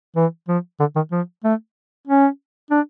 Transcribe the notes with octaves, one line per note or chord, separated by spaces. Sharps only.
E3
F3
D3
D#3
F3
A3
C#4
D4